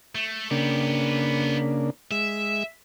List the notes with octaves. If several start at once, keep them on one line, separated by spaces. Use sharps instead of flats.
A3
C#3 A#3 B3 D4 G4
G#3 E5